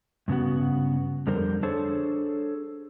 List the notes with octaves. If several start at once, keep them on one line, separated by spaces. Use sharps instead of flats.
G2 C#3 B3 F#4
F2 D3 G3 A#4 C5
D4 G#4 A4 C5 C#5